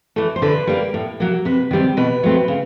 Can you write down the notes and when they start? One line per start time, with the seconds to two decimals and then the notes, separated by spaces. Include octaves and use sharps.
0.16 E3 A3
0.36 C5
0.42 D3 B4
0.67 G3 A#3
0.94 A2
1.20 F#3 A#3
1.45 C3 B4
1.71 D#3 G3 C4
1.97 B2 B4
2.23 F#3 A3 C4
2.48 C#3